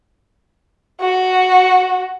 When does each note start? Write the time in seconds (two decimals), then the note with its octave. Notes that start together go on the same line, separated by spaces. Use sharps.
1.01 F#4